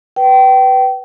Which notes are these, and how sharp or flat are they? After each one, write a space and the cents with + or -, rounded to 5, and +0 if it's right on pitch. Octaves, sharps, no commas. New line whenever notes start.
B4 +0 G5 -25